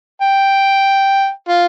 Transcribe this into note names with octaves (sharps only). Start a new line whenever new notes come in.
G5
F4